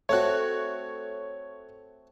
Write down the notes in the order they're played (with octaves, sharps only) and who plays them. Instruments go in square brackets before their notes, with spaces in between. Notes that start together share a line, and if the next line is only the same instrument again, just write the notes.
[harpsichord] A3 C4 F#4 [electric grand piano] C#5 F#6